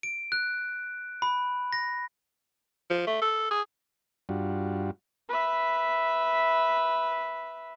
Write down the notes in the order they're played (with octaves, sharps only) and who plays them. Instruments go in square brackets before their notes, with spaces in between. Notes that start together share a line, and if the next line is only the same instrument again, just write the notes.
[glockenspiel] D7
F#6
B5
A#6
[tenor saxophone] F3
A3
A4
G#4
[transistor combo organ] G2 G3 D4 F4 F#4
[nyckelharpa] B4 E5